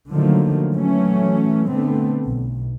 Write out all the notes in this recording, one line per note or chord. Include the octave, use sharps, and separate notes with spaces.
D3 D#3 F3 F#3 A3 A#3
E3 F#3 A3 C#4
D3 A3 B3 C4
B1